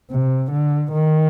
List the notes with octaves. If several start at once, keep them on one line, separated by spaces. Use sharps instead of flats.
C3
D3
D#3